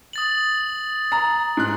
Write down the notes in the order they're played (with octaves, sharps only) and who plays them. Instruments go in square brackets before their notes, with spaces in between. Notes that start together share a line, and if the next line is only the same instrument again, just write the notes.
[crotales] D#6 A6 F#7
[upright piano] A#5
G#2 F#6